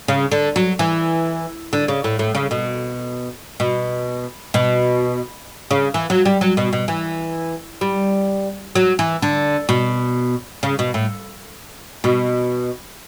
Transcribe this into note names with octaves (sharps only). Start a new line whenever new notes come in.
C#3
D3
F#3
E3
D3
C#3
A2
A2
C#3
B2
B2
B2
C#3
E3
F#3
G3
F#3
B2
B2
E3
G3
F#3
E3
D3
B2
C#3
B2
A2
B2